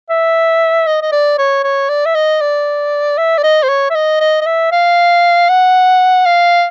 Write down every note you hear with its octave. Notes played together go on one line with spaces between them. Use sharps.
E5
D#5
D#5
D5
C#5
C#5
D5
E5
D#5
D5
E5
D5
D#5
C5
C#5
E5
D#5
D#5
D#5
E5
F5
F#5
F5